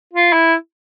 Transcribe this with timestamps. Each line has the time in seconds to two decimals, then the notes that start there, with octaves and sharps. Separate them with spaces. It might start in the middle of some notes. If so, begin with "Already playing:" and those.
0.13 F4
0.33 E4